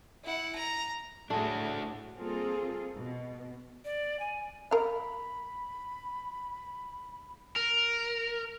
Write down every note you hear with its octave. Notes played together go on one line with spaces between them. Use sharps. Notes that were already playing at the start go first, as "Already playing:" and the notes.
E4 F#5
A#5
A2 A3 D4 F#4 G#4
G3 A#3 C4 F4 G#4 A4
B2
D5
G#5
A#4 F5 B5
A#4